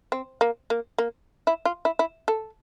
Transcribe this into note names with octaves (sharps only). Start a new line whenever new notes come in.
C4
A#3
A#3
A#3
E4
F4
E4
E4
A4